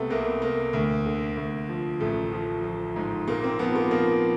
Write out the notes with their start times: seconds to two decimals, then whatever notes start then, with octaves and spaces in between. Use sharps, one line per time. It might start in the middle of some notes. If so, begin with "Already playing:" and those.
Already playing: C2 C3 A3 B3
0.10 C2 A#3
0.42 C2 A#3
0.73 D2
1.05 D3
1.37 D2
1.69 F3
2.00 A1 A3
2.32 F3
2.64 F3
2.96 G#2
3.27 A#2 A#3
3.44 C4
3.59 F3 B3
3.76 A#3
3.91 F3 A#3